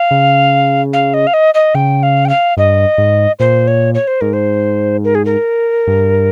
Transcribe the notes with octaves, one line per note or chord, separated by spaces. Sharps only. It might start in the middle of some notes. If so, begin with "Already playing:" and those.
Already playing: F5
C#3
F5
D#5
F5
D#5
D#5
C#3 G5
F5
G5
F5
G2 D#5
G#2
A#2 C5
C#5
C#5
C5
G#2 A#4
C5
A#4
G#4
A#4
G2